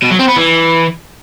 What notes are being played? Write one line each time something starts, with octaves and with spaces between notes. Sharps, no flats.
B2
F#3
C4
B3
E3